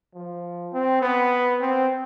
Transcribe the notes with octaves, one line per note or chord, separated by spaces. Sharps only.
F3
C4
B3
C4